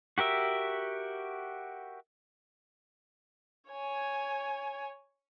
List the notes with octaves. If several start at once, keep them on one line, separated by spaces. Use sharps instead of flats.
F#4 G4 A#4 E5
C#5 G#5